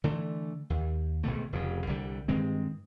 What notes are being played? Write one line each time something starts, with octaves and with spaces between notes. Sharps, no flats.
D3 E3 A3
D#2
G#1 B2 D3 A3
F1 F2 C#3
C2 D3 G3
G2 D#3 G#3 C4